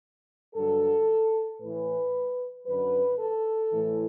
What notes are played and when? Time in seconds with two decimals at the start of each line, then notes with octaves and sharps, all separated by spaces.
0.55 G2 D3 F#3 A4
1.61 A2 E3 B4
2.66 F#2 D3 F#3 B4
3.18 A4
3.71 A2 E3